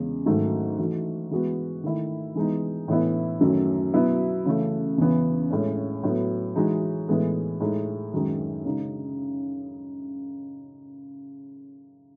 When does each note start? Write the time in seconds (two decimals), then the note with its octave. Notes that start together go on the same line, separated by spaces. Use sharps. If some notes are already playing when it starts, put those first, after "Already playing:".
Already playing: E2 C#3 G#3
0.26 G#2 D#3 F#3 A3 D#4
0.78 E3 A3 D#4 F#4
1.31 E3 G#3 B3 F#4
1.84 D#3 A3 E4
2.35 E3 G#3 B3 D#4
2.88 A2 E3 B3 E4
3.41 F#2 D#3 F#3 A3 C#4
3.94 B2 F#3 B3 E4
4.46 C#3 E3 A3
4.98 E2 C#3 E3 B3
5.50 A2 G#3 C#4
6.03 A2 F#3 B3
6.56 E3 G#3 D#4 F#4
7.08 A2 E3 G#3 B3
7.60 A2 G#3 D#4
8.13 F#2 D#3 G#3 D#4
8.65 C#3 G#3 D#4